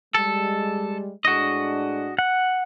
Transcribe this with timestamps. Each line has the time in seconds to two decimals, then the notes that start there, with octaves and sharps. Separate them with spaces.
0.15 G3 G#3 A4
1.25 A2 G#3 D4 F#4 D#5
2.19 F#5